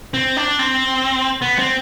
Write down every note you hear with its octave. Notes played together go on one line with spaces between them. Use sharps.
C4
D4
C4
B3
C4